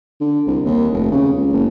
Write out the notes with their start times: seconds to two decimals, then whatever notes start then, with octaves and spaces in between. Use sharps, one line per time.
0.21 D3
0.47 C2
0.65 D#2
0.92 F1
1.12 C#3
1.36 C#2
1.53 F#1